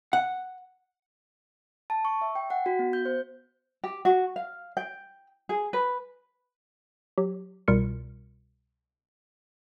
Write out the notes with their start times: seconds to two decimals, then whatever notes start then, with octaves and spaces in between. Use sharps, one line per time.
0.13 F#5
1.90 A5
2.05 C#6
2.21 E5
2.35 G5
2.50 F#5
2.66 F#4
2.79 B3
2.93 G6
3.05 C5
3.84 G4
4.05 F#4
4.36 F5
4.77 G5
5.49 G#4
5.73 B4
7.18 F#3 G4
7.68 C2 B2 G3 F4 A#4 C#7